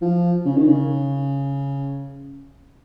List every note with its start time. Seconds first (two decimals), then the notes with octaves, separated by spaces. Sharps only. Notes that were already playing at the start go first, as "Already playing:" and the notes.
0.02 F3
0.45 C#3
0.56 D#3
0.67 C#3